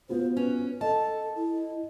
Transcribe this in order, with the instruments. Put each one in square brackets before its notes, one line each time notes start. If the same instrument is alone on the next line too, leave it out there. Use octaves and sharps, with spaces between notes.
[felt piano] B3 F4 F#4 [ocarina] C5
[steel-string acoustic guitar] C#4 [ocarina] B4
[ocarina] A4 [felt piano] D#5 [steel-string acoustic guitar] A5
[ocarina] E4